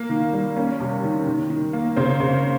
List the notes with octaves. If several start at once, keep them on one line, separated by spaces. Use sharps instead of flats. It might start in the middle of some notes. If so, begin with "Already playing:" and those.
Already playing: A#3
D#3
G3
A#3 C#4
C3
D#3
D#3
D#3
A#3
C#3 C4
C#3